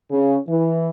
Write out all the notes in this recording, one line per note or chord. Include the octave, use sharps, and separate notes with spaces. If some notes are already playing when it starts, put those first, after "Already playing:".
C#3
E3